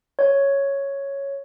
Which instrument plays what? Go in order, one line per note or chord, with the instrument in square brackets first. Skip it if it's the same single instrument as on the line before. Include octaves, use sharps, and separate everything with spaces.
[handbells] C#5